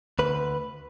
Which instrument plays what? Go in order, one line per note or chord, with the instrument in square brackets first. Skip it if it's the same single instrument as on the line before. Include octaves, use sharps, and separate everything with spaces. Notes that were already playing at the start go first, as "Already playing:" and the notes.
[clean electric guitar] D2 B4